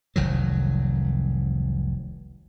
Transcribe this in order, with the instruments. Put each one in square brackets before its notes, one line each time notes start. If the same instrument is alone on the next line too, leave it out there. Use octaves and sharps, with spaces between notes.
[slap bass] F1 C2 D#3 F#3